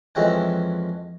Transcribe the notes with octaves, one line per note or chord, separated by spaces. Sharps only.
F2 E3 G#3 C#4 F#5 G5